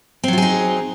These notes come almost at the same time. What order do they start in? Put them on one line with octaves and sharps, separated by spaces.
C4 F#3 F4 G#4 D#4